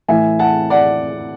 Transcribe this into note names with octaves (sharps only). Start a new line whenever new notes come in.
A2 E3 E5 G#5
F#5 A5
D5 F#5